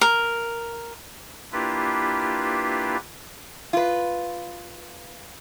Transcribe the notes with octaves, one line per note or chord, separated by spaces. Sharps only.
A#4
A#3 D4 E4 F4 G4 B4
F4 B4